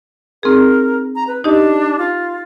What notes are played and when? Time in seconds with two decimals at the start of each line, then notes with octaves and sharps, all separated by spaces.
0.43 C4 D#4 G#4 A#4
1.15 A#5
1.27 B4
1.44 D4 D#4 G4 D#5
1.99 F4